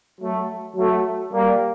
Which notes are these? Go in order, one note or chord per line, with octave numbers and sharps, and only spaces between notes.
F#3 A3
F#3 A3
G3 A#3